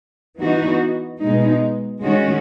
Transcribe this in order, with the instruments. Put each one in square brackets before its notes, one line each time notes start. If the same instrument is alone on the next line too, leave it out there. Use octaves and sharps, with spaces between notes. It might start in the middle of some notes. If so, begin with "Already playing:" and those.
[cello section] E3 B3 D#4 F#4
B2 G#3 D#4
D#3 G#3 C#4 F#4